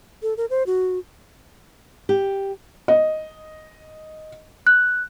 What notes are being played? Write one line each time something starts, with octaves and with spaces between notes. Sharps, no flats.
A4
A#4
C5
F#4
G4
D#5
F#6